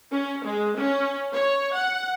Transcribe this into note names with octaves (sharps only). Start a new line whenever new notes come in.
C#4
G#3
C#4
C#5
F#5